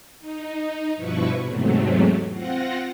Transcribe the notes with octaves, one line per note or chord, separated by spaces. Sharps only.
D#4
G2 B2 F3 E4 B4 C#6
E2 G#2 C3 F#3 A3
C4 F4 F#5 A#6